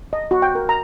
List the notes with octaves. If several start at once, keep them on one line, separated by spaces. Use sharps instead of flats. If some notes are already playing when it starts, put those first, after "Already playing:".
D#5
F#4
G5
A#4
A#5